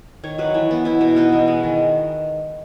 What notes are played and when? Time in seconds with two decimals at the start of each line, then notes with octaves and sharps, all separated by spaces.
0.24 D#3 C#5
0.38 F#3 B4
0.54 E3
0.71 B3
0.85 B3 E4
1.01 B2
1.16 B3 D#4
1.32 E3
1.48 G#3
1.63 D#3